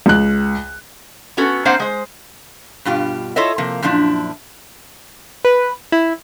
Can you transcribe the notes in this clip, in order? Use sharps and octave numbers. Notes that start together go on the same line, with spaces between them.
C#2 F#6
B3 C#4 F#4 A4
A#3 C4 D4 C5 F5 F#5
G#3 C5
G2 B2 F4 G4
E4 F4 A4 C#5 D#5 E5
C3 F3 A#3
F#2 A#2 F3 D4 E4
B4
E4